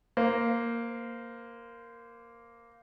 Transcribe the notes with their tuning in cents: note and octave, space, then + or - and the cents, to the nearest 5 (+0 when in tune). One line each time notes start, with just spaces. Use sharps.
A#3 +0 C5 -20